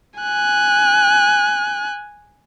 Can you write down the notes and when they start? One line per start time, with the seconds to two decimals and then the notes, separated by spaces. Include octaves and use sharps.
0.20 G#5 F#6